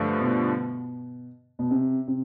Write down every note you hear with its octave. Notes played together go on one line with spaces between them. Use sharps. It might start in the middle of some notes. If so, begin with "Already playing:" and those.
Already playing: G2 D3 F3 A3
B2
B2
C3
C3